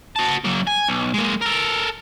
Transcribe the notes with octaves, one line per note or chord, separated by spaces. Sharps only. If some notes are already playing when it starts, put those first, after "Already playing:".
F#4 A5
F#2 A#3
G#5
B1
G#3 A#3
A4 A#4